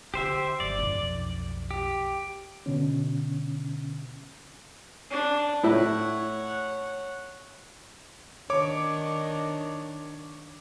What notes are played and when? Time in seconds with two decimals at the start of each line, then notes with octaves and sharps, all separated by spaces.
0.14 D3 G4 C5 E5
0.60 G1 F#2 D5
0.79 B1 F2
1.71 G4
2.66 B2 D3 C#4
5.10 D4
5.64 A2 E4 C#5 F#5
8.50 D#3 D4 C#5 D6